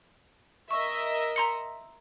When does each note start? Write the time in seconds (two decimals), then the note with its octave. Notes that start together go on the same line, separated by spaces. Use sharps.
0.71 A#4 D#5 E5 C#6
1.36 A#5 C6 C#7